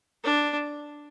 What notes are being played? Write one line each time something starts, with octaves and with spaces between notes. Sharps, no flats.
D4